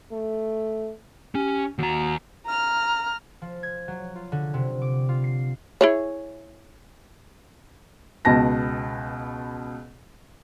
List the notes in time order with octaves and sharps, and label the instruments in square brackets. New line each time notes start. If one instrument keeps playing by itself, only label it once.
[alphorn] A3
[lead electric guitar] C#4 [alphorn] G4
[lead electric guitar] D#2 A#5 [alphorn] F#4
[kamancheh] A#5 F6
[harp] F3
G#6
F#3
F4
D3
C3
D6
F4
C7
[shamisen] E4 G#4 C#5
[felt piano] C#2 B2 A5 A#6